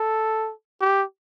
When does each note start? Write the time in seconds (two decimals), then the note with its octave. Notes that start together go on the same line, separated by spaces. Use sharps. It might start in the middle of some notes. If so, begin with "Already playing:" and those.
Already playing: A4
0.81 G4